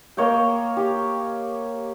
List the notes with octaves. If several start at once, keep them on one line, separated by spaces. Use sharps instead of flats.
A#3 C#5 D#5 G5
G4